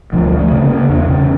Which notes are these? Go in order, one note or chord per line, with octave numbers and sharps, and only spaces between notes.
D2 F3
D2
A3
C#3
A#3
C#3
E2 D4
C#3 C#4